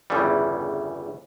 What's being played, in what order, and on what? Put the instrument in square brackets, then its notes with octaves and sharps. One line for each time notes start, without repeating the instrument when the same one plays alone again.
[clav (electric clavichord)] G1 E2 C#3 E3 G3